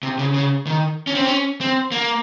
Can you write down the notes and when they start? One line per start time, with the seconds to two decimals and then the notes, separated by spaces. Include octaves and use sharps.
0.03 C3
0.19 C#3
0.34 C#3
0.67 D#3
1.07 C#4
1.15 C4
1.25 C#4
1.61 C4
1.92 A#3